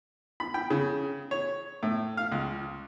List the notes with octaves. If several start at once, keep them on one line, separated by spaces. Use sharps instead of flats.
B5
G5
C#3
C#5
A2
F5
C#2